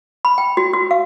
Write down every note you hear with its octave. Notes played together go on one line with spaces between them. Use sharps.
B5
G5
F#4
F#4
F5